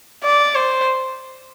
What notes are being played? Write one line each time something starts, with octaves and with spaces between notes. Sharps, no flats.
D5
C5